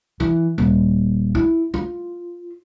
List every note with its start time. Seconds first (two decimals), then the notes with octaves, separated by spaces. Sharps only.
0.20 E3
0.58 D#1
1.35 E4
1.74 F4